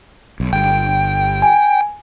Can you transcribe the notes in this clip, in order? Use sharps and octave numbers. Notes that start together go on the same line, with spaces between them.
B1
G1 G5
G#5